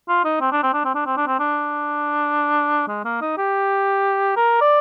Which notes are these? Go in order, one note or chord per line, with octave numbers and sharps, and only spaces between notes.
F4
D#4
C4
D4
C4
D4
C4
D4
C4
D4
C4
D4
G#3
A#3
D#4
G4
A#4
D5